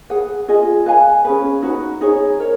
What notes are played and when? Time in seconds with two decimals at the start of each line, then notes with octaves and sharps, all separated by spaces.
0.10 G#4 B4 F#5
0.48 F4 G#4 D#5
0.86 B4 F5 G#5
1.25 C#4 G#4 B4
1.62 D#4 F#4 B4
2.01 D#4 G#4 C#5
2.39 A#4 C#5